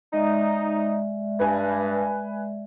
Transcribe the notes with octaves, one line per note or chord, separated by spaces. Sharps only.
G#3 D#4 D5 E5
G2 B4 G#5